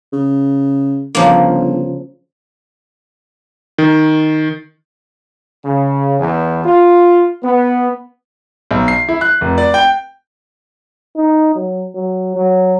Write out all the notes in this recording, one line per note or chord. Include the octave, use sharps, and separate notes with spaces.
C#3
G1 C#3 F3 A#3
D#3
C#3
E2
F4
B3
B1
C7
E4
F#6
F1
D5
G5
D#4
F#3
F#3
F#3